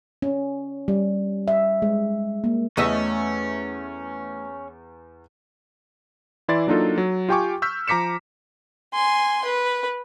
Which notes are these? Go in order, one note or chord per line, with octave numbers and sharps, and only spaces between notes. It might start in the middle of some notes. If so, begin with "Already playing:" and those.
C#4
G3
E5
G#3
A#3
E2 A3 C#4 D#5 E5 E6
E3 E4 D5 C6 A6
F#3 A#3 D4 D#4 F4 A4
F#3
F4 G4 G5 G#5 C#6 D6
C#6 E6 F6 G6 B6
F3 A#5 D6 B6 C#7 E7
G#5 C6
B4